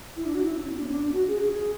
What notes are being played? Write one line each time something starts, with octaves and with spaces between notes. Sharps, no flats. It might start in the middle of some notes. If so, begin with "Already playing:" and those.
E4
D4
F#4
E4
C#4
B3
D4
C#4
D4
F#4
G#4
G#4